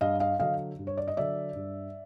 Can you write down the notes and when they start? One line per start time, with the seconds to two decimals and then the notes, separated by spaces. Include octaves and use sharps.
0.01 G2 D#5 F5
0.20 D#5 F5
0.40 D3 F#3 D#5 F5
0.79 G2
0.87 C#5
0.98 D5
1.08 D#5
1.17 D3 F#3 D5 E5
1.56 G2